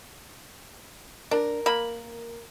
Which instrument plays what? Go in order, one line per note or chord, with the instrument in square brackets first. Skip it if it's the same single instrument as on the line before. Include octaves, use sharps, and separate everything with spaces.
[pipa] D4 [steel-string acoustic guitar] A#4
[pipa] A#3 B5